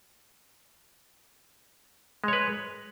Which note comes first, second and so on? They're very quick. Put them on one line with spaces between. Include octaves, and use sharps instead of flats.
G#3 C#5 B4